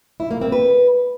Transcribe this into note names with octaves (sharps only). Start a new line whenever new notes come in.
E4
A#3
C4
B4